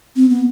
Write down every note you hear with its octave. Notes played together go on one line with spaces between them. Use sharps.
C4
B3